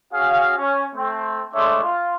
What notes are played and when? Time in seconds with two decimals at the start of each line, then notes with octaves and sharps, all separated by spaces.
0.13 C#4 F#4 G#4 F5
0.58 C#4
0.95 A3 C4
1.54 G#3 A3 D4 C#5 E5 C6
1.84 F4